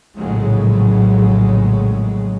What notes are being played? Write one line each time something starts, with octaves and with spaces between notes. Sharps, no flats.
A#1 A2 C#3 F#3 G#3